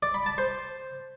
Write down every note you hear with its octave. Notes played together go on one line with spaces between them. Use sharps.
D5
B5
A5
C5